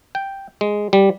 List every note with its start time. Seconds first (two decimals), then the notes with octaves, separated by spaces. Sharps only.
0.15 G5
0.61 G#3
0.93 G3